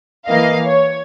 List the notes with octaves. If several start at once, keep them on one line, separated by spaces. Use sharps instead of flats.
E3 A#3 D#5 F5
C#5